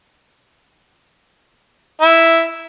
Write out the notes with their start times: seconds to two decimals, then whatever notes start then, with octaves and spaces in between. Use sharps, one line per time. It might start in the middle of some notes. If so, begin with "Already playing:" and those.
2.01 E4